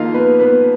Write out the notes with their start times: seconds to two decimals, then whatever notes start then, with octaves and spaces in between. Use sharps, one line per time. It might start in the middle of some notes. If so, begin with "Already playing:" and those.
Already playing: F2 D#3 A#3 D#4 F4 F5
0.14 B3 B4
0.40 B3 B4